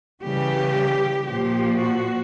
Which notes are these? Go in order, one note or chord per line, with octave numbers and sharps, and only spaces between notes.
C#3 E3 G3 G4
A#2 F3 A#3 G4
F#4